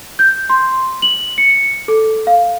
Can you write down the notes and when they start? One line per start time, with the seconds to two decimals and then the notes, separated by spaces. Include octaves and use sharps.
0.19 G6
0.50 C6
1.02 F#7
1.38 C#7
1.88 A4
2.27 F5